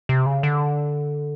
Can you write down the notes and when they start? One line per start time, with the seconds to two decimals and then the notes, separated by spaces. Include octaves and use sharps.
0.09 C3
0.26 C#3
0.43 D3